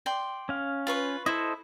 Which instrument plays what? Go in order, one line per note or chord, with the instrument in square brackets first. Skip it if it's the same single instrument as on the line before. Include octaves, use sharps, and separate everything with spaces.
[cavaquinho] D5 G5 C6
[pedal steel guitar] C#4 F5
[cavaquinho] F4 B4 C#6
[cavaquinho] E4 [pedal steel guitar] A4 C5 D#5